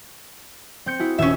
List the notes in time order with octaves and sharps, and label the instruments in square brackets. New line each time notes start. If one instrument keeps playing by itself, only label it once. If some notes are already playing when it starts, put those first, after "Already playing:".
[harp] C4 G6 C#7
E4 F#4 G#4
[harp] D#1 [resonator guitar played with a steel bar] C#4 E5